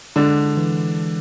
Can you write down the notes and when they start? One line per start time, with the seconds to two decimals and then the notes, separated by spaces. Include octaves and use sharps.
0.16 D3 G#3 D4
0.57 E3